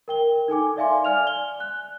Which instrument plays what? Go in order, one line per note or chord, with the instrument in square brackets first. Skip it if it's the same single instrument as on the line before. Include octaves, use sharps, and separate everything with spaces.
[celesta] A#4 G5 G7
D#4 A4 G#5 D6
D5 E5 F5 G#5 C6
D5 G#5 F6 F7
G7
F#6